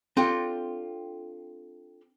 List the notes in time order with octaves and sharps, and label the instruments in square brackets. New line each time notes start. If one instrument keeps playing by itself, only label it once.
[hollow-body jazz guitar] C4 D4 F4 G4 A4